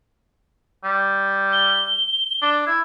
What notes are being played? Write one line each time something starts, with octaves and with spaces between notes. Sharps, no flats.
G3
G7
D4
E4 G#6